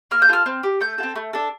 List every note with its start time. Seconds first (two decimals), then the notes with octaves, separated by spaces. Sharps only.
0.11 A#3 F6
0.22 G6
0.28 F4 A4 F6
0.46 C4
0.63 G4
0.81 A3 G6
0.98 F4 A4
1.03 C4
1.16 A3
1.33 D4 A4